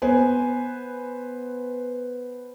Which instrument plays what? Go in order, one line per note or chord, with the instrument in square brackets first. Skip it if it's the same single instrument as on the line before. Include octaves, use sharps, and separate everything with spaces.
[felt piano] B3 B4 C5 G#5